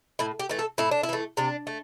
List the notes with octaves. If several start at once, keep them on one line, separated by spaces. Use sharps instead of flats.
A2 E4
G4
E3 A3
A4
A2 E4
D4
E4
E3 A3
C3 D4
A3